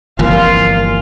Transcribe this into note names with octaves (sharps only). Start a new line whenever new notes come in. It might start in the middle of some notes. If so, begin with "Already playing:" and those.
G1 C2 E3 F3 A#3 F4 F5 G#5